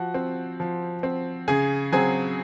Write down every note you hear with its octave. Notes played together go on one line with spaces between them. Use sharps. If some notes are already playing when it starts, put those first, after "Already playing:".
Already playing: F3 F#4 F#5
C4
F3
C4
C#3 G#4 G#5
F#3 C4 G#4 G#5